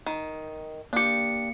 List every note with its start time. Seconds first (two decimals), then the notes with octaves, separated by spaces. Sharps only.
0.06 D#3
0.93 A#3 D4 G4 C#7